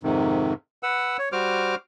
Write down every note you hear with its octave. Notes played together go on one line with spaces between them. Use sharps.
F2 G#2 C3 D#3
B4 F#5 E6
C#5
G3 F#4 C5 D6 F6